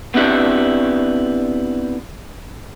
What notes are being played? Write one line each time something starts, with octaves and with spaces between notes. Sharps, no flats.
B3 C4 D4 E4 G4